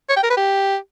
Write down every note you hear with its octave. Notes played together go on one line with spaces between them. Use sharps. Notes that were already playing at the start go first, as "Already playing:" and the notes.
C#5
G5
A#4
B4
G4